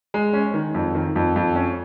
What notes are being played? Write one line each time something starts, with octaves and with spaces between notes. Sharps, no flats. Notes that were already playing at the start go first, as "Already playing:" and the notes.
G#3
C#4
D#3
F2
D#3
F2
F2
C#4